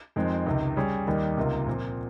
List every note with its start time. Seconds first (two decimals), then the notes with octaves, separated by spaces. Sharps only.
0.16 F2 D#3 G#3 C4
0.46 C#2 C3 D#3
0.76 G3 C#4 G#4 C#5
1.07 D#2 D#3 G3 A#3 D#4
1.37 C#2 C3 D#3 A#3 F4
1.67 A#2 F3 C4